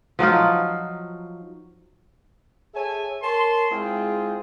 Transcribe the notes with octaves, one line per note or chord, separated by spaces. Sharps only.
F3 F#3 D#4 F4
G#4 A4 C#5 E5 G#5
A#4 C#5 A5 C6
G#3 C4 E4 F4 G#4 G5